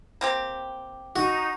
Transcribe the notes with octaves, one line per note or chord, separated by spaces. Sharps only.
A#3 C4 G4
D#4 F#4